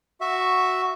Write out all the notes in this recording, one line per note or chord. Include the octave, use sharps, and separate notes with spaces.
F#4 E5